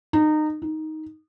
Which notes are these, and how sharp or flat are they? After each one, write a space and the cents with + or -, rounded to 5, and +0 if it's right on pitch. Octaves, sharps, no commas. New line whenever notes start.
D#4 -25
D#4 +10